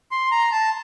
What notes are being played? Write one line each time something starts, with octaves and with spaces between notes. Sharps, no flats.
C6
A#5
A5